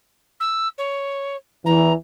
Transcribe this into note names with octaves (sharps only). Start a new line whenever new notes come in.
E6
C#5
E2 E3 A#5